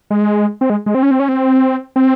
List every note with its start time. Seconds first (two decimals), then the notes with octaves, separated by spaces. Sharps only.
0.10 G#3
0.61 C4
0.70 G#3
0.86 G#3
0.95 C4
1.03 C#4
1.11 C4
1.20 C#4
1.29 C4
1.96 C4